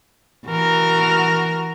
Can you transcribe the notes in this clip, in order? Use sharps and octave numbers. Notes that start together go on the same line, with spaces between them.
E3 F#4 A#4